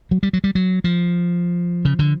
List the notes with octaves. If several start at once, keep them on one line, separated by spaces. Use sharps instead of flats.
F#3
G3
F#3
G3
F#3
F3
C#3
D3